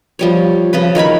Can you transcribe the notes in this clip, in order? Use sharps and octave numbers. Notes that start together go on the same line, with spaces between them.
F3 G3 C#5
C#3 F3 B4
D#3 A#4 C#5 B5